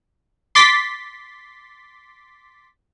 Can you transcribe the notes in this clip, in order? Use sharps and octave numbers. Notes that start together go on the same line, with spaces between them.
C6 D6 A6 B6